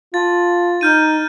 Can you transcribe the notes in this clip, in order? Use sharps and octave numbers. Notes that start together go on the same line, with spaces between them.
F4 A5 A6
D#4 F6 G6 D#7